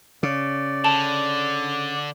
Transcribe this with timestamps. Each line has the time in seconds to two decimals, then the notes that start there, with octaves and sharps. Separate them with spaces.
0.23 C#3 D5
0.84 D3 A5